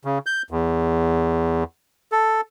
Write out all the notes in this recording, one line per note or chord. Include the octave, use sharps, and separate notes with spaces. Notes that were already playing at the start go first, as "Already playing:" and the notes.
C#3
G6
E2
A4